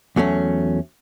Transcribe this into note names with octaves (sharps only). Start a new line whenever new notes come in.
E2 F#3 A3 C#4